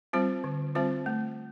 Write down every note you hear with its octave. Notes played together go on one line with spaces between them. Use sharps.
G3 C4 F4 C5
D3
G3 C4 F4 C5
A3